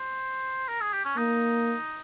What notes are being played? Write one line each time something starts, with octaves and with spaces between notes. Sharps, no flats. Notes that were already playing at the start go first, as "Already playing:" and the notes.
Already playing: C5
A#4
G#4
G4
C#4
A#3 D#4